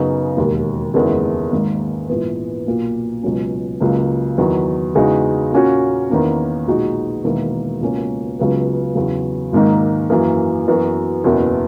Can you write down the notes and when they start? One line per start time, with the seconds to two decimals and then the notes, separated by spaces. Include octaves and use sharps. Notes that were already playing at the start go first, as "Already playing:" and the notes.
Already playing: F#2 C#3 F#3 B3 D#4
0.37 E1 D#2 D#3
0.94 F#1 E2 D#3 G#3
1.52 G#1 G#2 D#3 A#3
2.09 A#1 G#2 E3 B3
2.67 B1 A#2 A#3
3.23 C#2 B2 F#3 C#4
3.80 C#2 C#3 F#3 A#3
4.38 E2 D#3 F#3
4.95 E2 C#3 G#3 D#4 F#4
5.53 A#2 A#3 C#4 F#4
6.10 E2 D#3 A#3 C#4
6.67 B1 A#2 G#3 D#4 F#4
7.24 E1 E2 D#3 A#3 E4
7.81 C#2 B2 A#3 C#4
8.39 C#2 C#3 F#3 B3
8.95 E2 C#3 F#3
9.53 G#1 G#2 D#3 A#3 D#4
10.10 F#2 E3 A#3
10.68 F#2 E3 B3 F#4
11.24 F#1 E2 B2